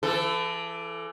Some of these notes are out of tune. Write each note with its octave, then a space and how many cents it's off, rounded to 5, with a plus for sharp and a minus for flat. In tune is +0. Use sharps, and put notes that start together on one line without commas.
E3 +35 A4 -5